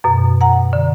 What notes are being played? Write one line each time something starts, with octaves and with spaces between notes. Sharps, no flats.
F#2 B2
F#5 A#5
D3